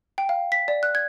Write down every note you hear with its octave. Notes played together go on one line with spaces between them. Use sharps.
G5
F5
B6
D5
F#6
G#6